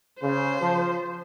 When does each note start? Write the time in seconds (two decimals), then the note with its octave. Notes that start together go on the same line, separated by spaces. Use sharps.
0.21 C#3 C5
0.61 F3